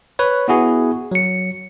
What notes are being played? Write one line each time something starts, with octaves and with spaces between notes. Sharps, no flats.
B4 C#5
B3 E4 F#4 G#4
F#3 C#7